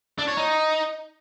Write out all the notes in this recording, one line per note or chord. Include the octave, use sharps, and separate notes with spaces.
D4
C#5
D#4